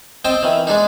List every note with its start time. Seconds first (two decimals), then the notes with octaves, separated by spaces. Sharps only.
0.25 C4 D#5 G5 A5
0.43 D#3 E3
0.67 G#3 D4 D#4